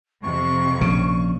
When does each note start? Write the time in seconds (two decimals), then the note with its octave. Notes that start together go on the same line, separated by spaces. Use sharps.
0.23 F2 C3 C#6
0.81 A#1 C#3